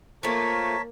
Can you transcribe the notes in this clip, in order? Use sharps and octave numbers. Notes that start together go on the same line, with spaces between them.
F3 A3 A#3 A#4 C#5 A5 B6